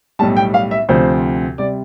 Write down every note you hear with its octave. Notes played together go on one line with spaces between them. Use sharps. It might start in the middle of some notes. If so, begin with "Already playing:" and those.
B1 A2 G3 A5
G5
F5
E5
D2 C3 F3 C4 C5
C3 G3 D5